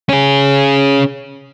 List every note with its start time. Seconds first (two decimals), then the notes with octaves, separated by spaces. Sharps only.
0.09 C#4 G#4